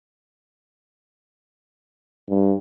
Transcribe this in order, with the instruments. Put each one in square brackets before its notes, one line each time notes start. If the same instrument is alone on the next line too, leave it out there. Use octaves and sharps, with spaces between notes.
[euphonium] G2